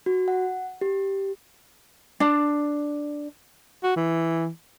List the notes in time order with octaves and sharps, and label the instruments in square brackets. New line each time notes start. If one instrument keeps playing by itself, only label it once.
[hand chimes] F#4
F#5
G4
[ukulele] D4
[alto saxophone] F#4
E3